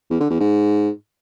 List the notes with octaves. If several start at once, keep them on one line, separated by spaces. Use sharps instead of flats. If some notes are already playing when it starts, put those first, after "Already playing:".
E2
D3
E2
G#2